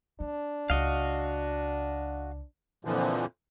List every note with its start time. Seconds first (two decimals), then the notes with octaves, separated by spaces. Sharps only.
0.20 C4 D4
0.70 C#2 F#4 D#5 F5
2.85 F2 A#2 D3 E3 F3